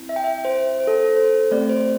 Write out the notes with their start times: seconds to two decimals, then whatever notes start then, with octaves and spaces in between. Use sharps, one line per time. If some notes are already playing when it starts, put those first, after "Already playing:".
Already playing: C4 E4
0.09 E5
0.16 G5
0.24 E5
0.45 C5
0.80 C5
0.87 A4
1.02 A4
1.16 C5
1.51 A3 C4 G4 D5
1.69 C5